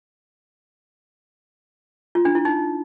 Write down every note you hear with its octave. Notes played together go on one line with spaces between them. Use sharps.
F4
D4
E4
D#4